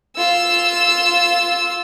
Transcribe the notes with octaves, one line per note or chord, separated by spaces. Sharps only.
F4 E6